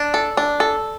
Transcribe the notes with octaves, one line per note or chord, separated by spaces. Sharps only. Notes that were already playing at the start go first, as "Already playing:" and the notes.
Already playing: D4
A4
D4
A4